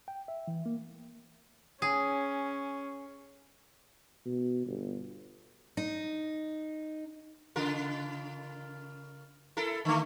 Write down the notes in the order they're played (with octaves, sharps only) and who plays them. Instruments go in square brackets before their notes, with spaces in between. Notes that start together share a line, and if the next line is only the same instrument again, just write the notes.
[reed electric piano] G5
E5
E3
A#3
[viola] C#4 [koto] G#4
[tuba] B2
G1
[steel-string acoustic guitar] D#4
[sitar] C#3 F4 A#4
E4 A4 A#4
D3 A3